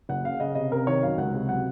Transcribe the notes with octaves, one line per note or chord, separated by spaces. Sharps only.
F#1 F#5
C#3 F5
C#3 D#5
C3 D#5
C3 A#4
D#3 C#5
F#2 F5
C#2 F#5
C3
F#3 F#5